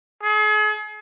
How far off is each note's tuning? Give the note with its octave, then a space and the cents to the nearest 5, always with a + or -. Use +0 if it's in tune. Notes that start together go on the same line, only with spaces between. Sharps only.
G#4 +40